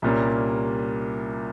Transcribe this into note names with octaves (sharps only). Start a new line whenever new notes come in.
C2 A#2 G3 A#3 C#4